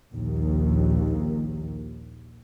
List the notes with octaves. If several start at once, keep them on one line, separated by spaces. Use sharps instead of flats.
A#1 D#2